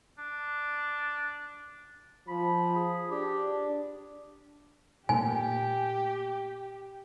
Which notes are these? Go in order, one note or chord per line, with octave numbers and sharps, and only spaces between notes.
D4
F3 B5
G#4
D4 G4
A#2 A3 A#3 G4 G#5